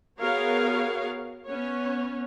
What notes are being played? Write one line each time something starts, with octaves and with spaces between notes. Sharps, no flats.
B3 F#4 G#4 A#4 C#5 F5
B3 C#4 C#5